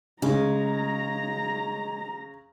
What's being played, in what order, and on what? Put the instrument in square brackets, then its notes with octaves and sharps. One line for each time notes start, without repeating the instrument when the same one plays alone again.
[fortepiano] C#3 [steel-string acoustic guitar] G#3 [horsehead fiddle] A#5